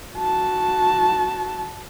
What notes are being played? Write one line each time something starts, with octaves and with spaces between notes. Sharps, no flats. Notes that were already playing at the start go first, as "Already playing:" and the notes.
F#4 A5